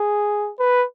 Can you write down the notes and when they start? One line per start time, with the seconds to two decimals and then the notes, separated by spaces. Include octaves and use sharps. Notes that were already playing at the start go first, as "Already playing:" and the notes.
Already playing: G#4
0.59 B4